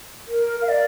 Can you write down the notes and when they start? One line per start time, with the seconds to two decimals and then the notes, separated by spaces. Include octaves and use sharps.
0.28 A#4
0.62 F5
0.69 D5